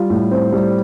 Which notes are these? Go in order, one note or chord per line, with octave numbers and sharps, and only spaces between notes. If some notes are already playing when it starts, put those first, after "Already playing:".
Already playing: G3 F4
A2
C4
G3